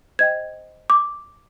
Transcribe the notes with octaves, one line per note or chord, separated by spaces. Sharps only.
C5 D#5 G5 G#6
D6